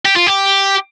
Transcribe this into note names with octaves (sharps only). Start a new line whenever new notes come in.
G4
F4
G4